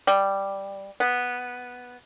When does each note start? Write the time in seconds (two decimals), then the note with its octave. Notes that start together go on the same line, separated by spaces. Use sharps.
0.07 G3
1.00 B3